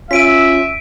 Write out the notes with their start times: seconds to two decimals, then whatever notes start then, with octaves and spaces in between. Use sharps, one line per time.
0.11 C#4 F4 E5 B6 D7 D#7